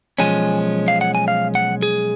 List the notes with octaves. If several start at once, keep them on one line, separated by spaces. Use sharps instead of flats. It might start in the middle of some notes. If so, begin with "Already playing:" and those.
B1 A#2 F3 G#3 C#4 G#5
F5
F#5
G#5
F5
F#5
G#4